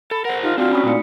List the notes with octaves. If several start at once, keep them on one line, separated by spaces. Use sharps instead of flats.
A4 B5
A#4 C5 F#5
D#4 F4 G4
C4 D4 F4 F#4 D5
C#4 B5 D#6 B6
A#2 A3 D#4 C#7